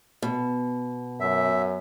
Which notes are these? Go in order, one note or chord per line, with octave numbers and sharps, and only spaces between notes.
B2
F#2 E5